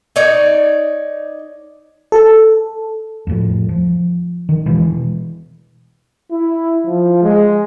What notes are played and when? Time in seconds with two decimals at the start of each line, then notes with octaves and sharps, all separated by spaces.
0.16 D#4 C#5 D5
2.12 A4
3.27 F2 A2
3.69 F3
4.49 D#3
4.66 B2 E3 G#3
6.31 E4
6.86 F3
7.23 G#3